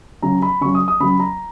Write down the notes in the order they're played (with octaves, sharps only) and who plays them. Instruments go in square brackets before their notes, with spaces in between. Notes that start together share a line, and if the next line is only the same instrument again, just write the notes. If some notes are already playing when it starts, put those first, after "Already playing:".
[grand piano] C#3 F#3 A#5
B5
C#3 F#3 C#6
D#6
D#6
C#3 F#3 B5
A#5